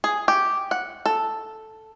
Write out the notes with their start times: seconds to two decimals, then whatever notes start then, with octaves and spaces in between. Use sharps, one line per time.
0.04 G#4
0.28 G4
0.71 F#5
1.06 A4